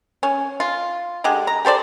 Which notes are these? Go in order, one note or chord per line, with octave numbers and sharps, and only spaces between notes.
C#4
F4
D3 G#3 G4
A#5
G4 A4 C5 D5